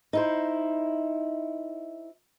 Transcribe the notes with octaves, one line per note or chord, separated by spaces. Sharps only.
D#4 E4 C5